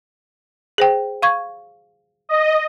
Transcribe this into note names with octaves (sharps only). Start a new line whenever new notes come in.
G#4 C5 G5
F5 C#6 G#6
D#5